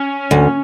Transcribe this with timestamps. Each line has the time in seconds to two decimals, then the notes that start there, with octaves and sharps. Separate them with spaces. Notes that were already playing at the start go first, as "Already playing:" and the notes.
Already playing: C#4
0.31 D2